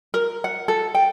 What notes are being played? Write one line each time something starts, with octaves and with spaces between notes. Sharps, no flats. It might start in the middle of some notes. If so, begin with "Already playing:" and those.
A#4
F#5
A4
G5